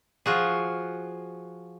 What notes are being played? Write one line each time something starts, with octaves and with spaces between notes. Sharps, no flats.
F3 F4 F#4 G#4